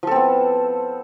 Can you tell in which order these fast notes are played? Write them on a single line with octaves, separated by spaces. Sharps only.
F3 A4 C4 B3